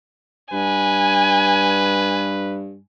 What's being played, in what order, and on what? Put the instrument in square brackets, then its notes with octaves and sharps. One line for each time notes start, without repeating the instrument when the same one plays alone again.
[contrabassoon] G2 [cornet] B4 [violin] G#5